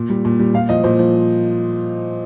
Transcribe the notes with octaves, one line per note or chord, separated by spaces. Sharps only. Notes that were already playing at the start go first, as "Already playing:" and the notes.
Already playing: A#2
G3
A#2
G3
A#2 F5
F3 D#5
A#2 C5
F3